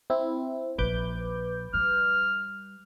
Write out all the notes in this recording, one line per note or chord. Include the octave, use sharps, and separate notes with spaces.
C4 E4
A#1 B4 D6 G6
G3 F6